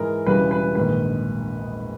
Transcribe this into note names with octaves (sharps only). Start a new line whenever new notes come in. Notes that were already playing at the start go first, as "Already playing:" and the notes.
Already playing: G#2 E3 G#3 A#4
E1 E2 C#3 E3 G3 B4
B4
A#1 G#2 D#3 B4